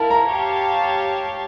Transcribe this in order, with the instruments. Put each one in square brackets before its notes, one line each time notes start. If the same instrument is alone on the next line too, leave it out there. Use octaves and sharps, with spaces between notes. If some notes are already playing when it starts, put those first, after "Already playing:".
Already playing: [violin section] E4 A#4 [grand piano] E5 F5 A5
[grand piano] A#5
[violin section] G4 C#5 F5 A5